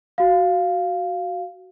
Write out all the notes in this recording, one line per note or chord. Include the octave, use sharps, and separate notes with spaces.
F#4 F5